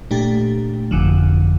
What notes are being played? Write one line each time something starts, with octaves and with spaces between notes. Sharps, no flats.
A#2 A3 D4 G4
G1 F2 D3 F3